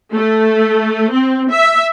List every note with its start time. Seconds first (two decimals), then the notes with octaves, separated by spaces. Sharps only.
0.13 A3
1.11 C4
1.51 E5